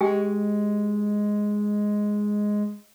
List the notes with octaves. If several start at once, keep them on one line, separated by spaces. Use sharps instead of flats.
G#3 G4 G#4 G5